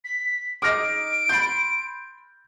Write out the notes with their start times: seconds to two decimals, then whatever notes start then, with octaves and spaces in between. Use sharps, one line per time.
0.04 B6
0.62 D#4 G#4 D6 F6 A#6 D7
1.29 B5 C6 G6 A6